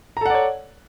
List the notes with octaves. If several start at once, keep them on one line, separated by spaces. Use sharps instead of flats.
A4 C#5 D5 F#5 A#5